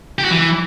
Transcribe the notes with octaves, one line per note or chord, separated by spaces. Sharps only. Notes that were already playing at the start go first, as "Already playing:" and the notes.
G4
F#4
E3